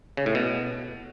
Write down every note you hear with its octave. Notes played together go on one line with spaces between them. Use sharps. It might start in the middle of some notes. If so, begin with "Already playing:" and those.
C#3
A2
B2